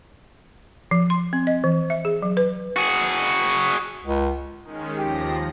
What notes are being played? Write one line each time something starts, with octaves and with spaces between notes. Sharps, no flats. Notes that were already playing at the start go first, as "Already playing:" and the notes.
F3
C6
C4
D#5
E3
E5
G#4
F#3
B4
F#4 G#4
C#2
D#3 G#3 C#4
D#2 F3 G4 A#6